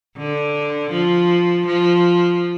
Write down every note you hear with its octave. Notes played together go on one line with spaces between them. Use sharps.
D3
F3
F3